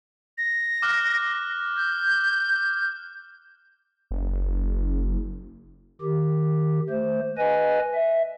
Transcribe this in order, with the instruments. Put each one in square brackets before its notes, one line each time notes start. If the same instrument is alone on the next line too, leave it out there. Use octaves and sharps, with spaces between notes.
[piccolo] A#6
[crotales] D6 F6 F#6
[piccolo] G6
[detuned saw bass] F#1
[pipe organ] D#3 G4
A3 C5
B4 D#5 G#5
E5